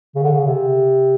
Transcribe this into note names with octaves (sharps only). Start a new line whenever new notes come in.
C#3
D3
C#3
C3